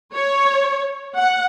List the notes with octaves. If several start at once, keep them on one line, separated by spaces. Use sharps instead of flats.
C#5
F#5